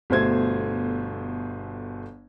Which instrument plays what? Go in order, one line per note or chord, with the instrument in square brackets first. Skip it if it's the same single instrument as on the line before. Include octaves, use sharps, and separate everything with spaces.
[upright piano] G1 B2 A3 C5 G#6